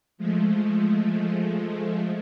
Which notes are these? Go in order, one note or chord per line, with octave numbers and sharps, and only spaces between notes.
F3 G#3 A3